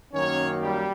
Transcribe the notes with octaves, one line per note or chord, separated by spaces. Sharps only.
F#2 D#3 F#3 A#3 C#4 C#5
G3 G4